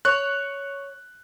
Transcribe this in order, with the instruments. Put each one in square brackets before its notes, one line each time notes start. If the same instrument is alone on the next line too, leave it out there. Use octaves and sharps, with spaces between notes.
[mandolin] C#5 [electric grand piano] F#6